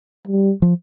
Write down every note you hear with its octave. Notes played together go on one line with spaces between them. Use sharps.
G3
F3